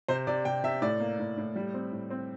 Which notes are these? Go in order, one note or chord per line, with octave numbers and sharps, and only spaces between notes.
C3 C5
C3 D5
C3 G5
C3 E5
A2 D5
A#3
A2
A2
G3
C4
A2
C4